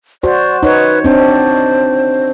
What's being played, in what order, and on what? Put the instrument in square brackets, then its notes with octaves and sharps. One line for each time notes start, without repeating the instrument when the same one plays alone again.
[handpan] F#4 C5 [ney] D5
[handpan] D#4 C#5 [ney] B4
[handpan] C4 D4 [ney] C5